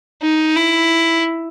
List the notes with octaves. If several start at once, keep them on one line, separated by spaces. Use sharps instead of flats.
D#4
E4